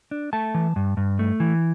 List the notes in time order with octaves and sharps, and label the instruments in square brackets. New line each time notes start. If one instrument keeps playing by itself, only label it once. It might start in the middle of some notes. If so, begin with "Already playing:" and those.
[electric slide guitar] D4
A3 A5
E3
G2
G2
A3
E3